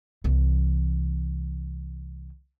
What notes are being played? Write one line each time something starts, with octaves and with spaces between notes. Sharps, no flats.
C2 E3